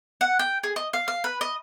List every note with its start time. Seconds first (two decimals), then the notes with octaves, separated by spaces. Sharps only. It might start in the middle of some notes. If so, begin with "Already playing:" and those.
0.21 F#5
0.39 G5
0.64 G#4
0.76 D#5
0.93 F5
1.08 F5
1.24 B4
1.41 D#5